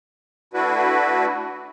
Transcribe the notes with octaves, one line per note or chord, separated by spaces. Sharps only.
A3 D4 E4 F#4 B4